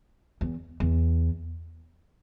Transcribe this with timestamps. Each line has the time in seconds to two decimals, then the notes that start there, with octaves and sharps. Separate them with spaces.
0.41 E2
0.80 E2